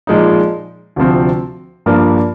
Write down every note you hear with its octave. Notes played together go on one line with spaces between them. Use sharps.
A#2 F3 G#3 D#4
D2 C3 F3 C4
G2 F3 A#3 D4